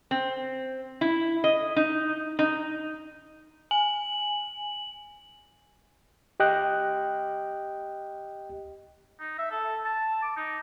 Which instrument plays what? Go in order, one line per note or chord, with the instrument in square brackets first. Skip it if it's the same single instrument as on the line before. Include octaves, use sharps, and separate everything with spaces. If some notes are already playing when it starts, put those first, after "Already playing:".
[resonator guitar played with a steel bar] C4
E4
D#5
D#4
D#4
[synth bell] G#5 [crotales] F#7
[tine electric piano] G4 D#5 G5 F#6
[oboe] D#4
E5
A4
A5
D6
D#4